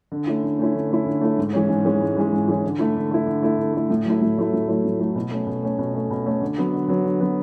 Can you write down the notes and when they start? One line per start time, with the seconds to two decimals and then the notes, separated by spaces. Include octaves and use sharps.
0.12 D3
0.27 A3 C#4 E4
0.44 D3
0.59 A3 C#4 E4
0.75 D3
0.91 A3 C#4 E4
1.06 D3
1.21 A3 C#4 E4
1.38 G#2
1.53 E3 G#3 C#4
1.69 G#2
1.85 E3 G#3 C#4
2.00 G#2
2.16 E3 G#3 C#4
2.32 G#2
2.48 E3 G#3 C#4
2.64 D3
2.79 A3 E4
2.96 D3
3.11 A3 E4
3.27 D3
3.42 A3 E4
3.58 D3
3.73 A3 E4
3.90 A2
4.05 F#3 A3 E4
4.22 A2
4.37 F#3 A3 E4
4.53 A2
4.68 F#3 A3 E4
4.84 A2
5.00 F#3 A3 E4
5.16 B2
5.31 A3 C#4
5.47 B2
5.63 A3 C#4
5.78 B2
5.94 A3 C#4
6.10 B2
6.26 A3 C#4
6.41 D3
6.58 F#3 B3
6.73 D3
6.89 F#3 B3
7.04 D3
7.21 F#3 B3